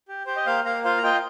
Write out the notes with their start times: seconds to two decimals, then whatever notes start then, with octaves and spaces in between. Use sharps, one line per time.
0.08 G4
0.26 G4 C5
0.36 D#5
0.46 A#3 C5 F5
0.65 A#3 F5 A#5
0.84 F4 C5 F5
0.98 A#5
1.03 F4 D#5 G5